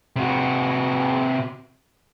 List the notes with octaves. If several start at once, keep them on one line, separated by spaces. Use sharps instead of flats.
C3 F#4